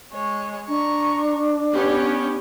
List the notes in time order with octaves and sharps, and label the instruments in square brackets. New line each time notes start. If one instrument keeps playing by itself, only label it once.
[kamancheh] G#3 C#5
[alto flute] D4 [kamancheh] A#5 C#6
[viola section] B3 G4 C#5 [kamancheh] C#4